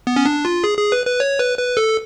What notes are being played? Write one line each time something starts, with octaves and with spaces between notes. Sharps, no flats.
B3
C#4
D4
F4
G#4
G#4
B4
B4
C#5
B4
B4
A4